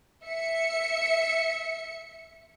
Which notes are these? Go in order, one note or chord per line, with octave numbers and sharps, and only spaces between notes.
E5 C#7